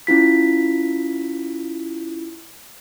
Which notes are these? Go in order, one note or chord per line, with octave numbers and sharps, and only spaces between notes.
C#4 E4 F4 B6